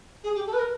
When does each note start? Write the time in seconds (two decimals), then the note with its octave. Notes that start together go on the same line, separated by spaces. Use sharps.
0.23 G#4
0.35 G4
0.46 A4
0.53 B4
0.58 A#4